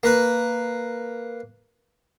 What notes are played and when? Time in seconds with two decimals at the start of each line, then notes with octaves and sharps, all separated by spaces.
0.03 A#3 B4